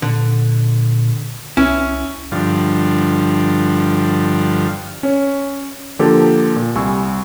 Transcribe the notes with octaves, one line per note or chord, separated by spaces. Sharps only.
A#2 D3
C2 C#4 E4
G2 D3 F3
C#4 C#5
D3 F3 A#3 G4 A4
A#2
C2 G3 G#5 C#6 E6